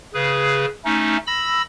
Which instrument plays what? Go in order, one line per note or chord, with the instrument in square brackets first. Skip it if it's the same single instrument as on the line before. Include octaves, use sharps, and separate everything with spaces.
[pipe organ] C#3 G#4 B4
A3 C#4 D#4
B5 E6 A#6